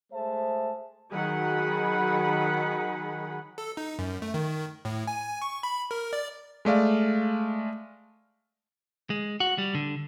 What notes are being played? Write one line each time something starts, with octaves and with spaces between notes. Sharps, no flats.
G#3 A3 C5 E5 A5
D#3 F#3 G#4 F#5 B5
A4
D#4
F#2
A3
D#3
A2
G#5
C#6
B5
A#4
D5
G#3 A3 D5 F5
G#3
F#4
G3
D3